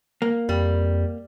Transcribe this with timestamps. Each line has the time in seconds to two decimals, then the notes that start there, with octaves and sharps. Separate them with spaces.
0.22 A#3
0.49 F2 G3